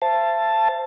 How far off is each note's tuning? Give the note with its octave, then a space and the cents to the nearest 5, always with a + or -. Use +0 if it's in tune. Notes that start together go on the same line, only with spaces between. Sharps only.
C5 +0 E5 +40 A5 +0